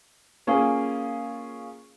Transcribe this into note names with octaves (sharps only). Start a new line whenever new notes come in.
A#3 C#4 F4 G#4